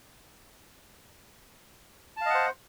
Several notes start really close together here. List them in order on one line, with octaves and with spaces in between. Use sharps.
A5 F5 D#5 F#5 C5